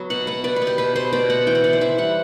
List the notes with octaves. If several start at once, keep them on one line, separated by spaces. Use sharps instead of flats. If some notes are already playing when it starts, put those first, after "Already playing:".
Already playing: F#3 B3
B2 F#5
B3 F#5
B3 D5
B4
B3
G4
B2 B4
B2 C5
B2 D5
B3 F#5
E3 G5
F#5
E3 D5
C5
E3 E5
G3 F#5